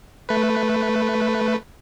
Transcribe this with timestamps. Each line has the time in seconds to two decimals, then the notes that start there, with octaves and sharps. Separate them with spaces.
0.29 A3 B4